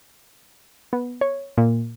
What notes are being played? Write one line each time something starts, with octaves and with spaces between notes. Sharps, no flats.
B3
C#5
A#2